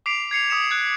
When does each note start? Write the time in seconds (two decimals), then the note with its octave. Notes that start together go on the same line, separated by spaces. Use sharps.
0.06 D6 B6 C7 D7 F7
0.31 G#6 C7 C#7 F7
0.50 D6 D#6 B6 C#7 E7
0.71 F#6 G#6